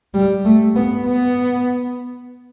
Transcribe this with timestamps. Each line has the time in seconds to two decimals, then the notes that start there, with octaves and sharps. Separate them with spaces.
0.14 G3
0.45 A3
0.76 B3
1.06 B3